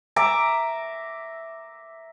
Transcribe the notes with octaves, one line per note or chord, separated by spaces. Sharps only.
E5 A#5 D6